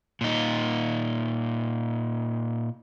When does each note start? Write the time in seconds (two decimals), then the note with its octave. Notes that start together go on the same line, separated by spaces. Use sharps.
0.21 A#2 D#4